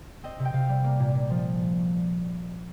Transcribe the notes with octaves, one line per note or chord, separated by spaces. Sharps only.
C4 D#5
C3
G5
C3 F5
G3
A#3
A#2
A#2
F3